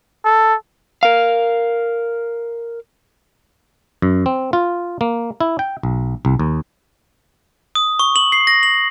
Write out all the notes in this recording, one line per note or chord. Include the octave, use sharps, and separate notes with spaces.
A4
A#4 F5
F#2
C4
F4
A#3
E4
G5
B1
C2
D#2
D#6
C#6
F#7
C7
A#6
F#7